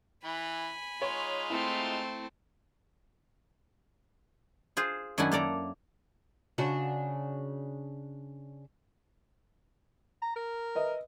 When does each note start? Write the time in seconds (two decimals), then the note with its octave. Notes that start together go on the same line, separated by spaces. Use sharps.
0.24 E3 G#5 B5
1.02 G#3 D#4 F4 C#5
1.50 A3 C4 E4
4.77 F4 G#4 C5
5.18 F#2 D#3 D4 E4 F#5 G#5
5.31 A#3 A4 D5 A#5
6.58 C#3 D4 F#4
10.22 A#5
10.36 A#4
10.75 B4 D#5 E5